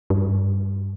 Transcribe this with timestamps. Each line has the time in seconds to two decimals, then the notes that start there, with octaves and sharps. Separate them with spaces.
0.10 G2